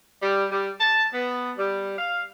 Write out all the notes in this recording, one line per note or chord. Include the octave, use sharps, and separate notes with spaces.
G3
G3
A5
B3
G3
F5